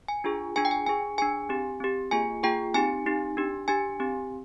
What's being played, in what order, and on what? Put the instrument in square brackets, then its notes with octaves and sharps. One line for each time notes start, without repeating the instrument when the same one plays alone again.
[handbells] G#5
D4 F4 G#4
D4 F4 G#4 G#5
G5
G#5
D4 G#4 G#5
D4 G#4 G#5
C4 G4
C4 G4
A#3 F4 G#4 G#5
A#3 F4 G#4 G5
C4 D#4 G4 G#5
C4 D#4 G4
D4 G4
D4 G4 G#5
C4 G4